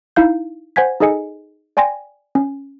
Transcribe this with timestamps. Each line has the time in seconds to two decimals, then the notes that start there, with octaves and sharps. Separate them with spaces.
0.16 D#4 E4 F5 G6
0.76 C5 F#5 G#5 G#6 B6
1.00 D#4 G#4 A4 D#5 G#5 C#7
1.77 D5 G5 G#5 C6 A#6
2.35 C#4